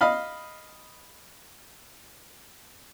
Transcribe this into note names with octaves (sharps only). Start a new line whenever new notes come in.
D#5 F5 B5